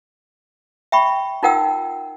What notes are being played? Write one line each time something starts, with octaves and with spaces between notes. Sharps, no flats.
E5 G5 B5 C#6
D#4 F4 A#4 F#5 G5 E6